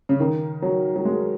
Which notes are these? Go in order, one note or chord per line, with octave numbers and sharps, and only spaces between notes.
C#3
D#3
F#3
F#3
G#3